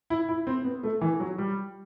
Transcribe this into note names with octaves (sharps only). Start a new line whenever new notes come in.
E4
E4
C4
B3
A3
E3
F#3
G3